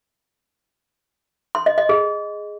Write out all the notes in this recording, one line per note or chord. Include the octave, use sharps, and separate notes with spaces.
C6
D#5
D#5
G#4